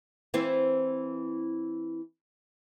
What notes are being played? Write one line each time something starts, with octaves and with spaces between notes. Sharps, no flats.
E3 C4